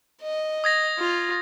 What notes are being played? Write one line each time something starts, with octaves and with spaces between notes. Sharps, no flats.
D#5
D#6 G#6 A#6
F4